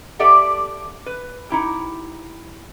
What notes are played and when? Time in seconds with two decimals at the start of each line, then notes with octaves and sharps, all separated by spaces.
0.19 G4 A4 D5 E5 F#5
1.06 B4
1.50 D#4 E4 G4